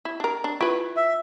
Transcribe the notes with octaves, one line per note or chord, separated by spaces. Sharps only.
E4
D4 A#4
D4
E4 F4 B4
E5